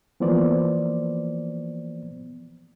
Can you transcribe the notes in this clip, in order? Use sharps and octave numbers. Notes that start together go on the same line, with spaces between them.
E3 F3 A#3 B3 C5 D5